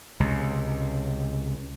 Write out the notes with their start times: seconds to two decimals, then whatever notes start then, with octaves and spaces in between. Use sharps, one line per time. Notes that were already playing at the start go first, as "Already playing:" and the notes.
0.20 C#2 C3